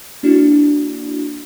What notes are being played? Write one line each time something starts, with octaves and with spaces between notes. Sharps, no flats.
A#3 D4 E4 F#4